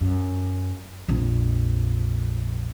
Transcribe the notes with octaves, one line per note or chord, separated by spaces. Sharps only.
F#2
A#1 F2